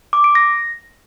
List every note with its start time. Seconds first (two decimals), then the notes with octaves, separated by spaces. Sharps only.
0.13 D6
0.24 D7
0.35 A#6